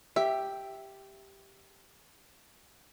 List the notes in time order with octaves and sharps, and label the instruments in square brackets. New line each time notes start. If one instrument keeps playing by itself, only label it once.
[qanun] G4 [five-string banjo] E5